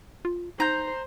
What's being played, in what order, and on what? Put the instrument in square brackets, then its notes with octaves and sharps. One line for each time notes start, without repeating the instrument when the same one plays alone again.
[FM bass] F4
[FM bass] D#4 [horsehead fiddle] C5 [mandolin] A#5 G6